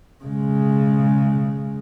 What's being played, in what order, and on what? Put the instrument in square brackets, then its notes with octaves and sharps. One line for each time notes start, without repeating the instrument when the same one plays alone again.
[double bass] C#3 G#3